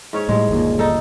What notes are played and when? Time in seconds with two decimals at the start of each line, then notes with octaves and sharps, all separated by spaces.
0.13 G#2 C#4 C#5
0.29 A2 G3 G#3
0.49 G1 D#2 A#2
0.79 D#4 A4